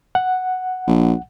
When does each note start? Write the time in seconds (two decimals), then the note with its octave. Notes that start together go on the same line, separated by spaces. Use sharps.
0.15 F#5
0.87 A#1